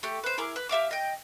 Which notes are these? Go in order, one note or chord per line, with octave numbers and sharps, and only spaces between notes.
A3 G4
B4 C5
E4 G#4 A#4 D6
B4
G4 E5 F5 D6
D#5 G5